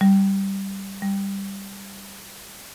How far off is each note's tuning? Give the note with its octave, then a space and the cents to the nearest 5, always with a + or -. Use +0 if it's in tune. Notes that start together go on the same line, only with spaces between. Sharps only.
G3 -5
G3 +10